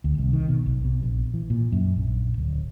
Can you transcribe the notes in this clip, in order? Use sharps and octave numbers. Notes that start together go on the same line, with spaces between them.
D2
C2
D#3
B2
B1
B2
A#1
E3
A#2
F#2
A#1
D1